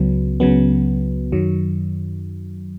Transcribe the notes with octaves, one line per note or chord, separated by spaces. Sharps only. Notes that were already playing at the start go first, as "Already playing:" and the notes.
Already playing: C#2 C#3 F#3 B3
C#2 C#3 F#3 B3
F#2 D#3 F#3